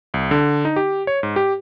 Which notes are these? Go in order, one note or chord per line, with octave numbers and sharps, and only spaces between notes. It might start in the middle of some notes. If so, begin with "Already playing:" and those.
C2
D3
D#4
G4
C#5
G#2
G4